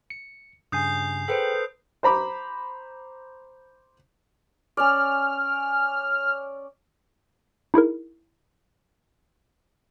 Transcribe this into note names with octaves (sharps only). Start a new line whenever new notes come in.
C#7
G2 C#3 G#5 D#6 G6 C7
G#4 A4 B4 C5 G5
C5 A#5 B5 D6
C#4 D5 F6
D#4 E4 G#4 A#4